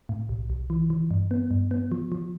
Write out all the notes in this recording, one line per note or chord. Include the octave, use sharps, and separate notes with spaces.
A2
B1
B1
E3
E3
G2
B3
G2
B3
F3
F3